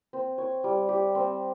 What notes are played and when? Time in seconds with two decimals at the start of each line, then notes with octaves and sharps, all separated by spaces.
0.13 C4
0.38 C#5
0.64 G3
0.89 G4
1.15 C4